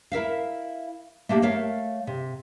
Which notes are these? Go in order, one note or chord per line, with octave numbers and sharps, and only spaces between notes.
E4 A#4 E5 F5
A3 A#3 D4 G4
A3 A#4 C#5 F5
C3